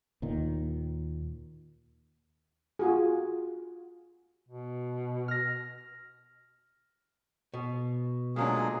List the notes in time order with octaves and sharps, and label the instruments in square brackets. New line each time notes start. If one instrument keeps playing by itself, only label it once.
[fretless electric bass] D#2 A#2 D#3
[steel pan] F4 F#4 G#4
[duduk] B2
[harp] F6 A#6
[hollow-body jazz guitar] B2
[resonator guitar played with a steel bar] A#2 A#3 D4 [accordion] F#3 G#3 G#4